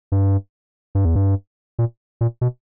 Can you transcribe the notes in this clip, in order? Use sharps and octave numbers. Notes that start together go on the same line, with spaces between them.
G2
G2
E2
G2
A#2
A#2
B2